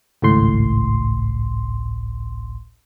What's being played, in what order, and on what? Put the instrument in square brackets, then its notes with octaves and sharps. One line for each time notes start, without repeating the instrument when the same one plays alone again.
[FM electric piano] G#1 C#2 A2 C6